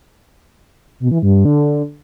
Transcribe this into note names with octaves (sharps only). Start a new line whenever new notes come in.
B2
E3
G2
G2
D3